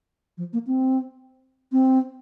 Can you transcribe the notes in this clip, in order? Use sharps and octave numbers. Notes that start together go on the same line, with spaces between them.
F3
A#3
C4
C4